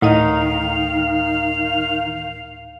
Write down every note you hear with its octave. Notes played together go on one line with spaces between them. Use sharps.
D2 A2 D#3 D#4 D#5 F5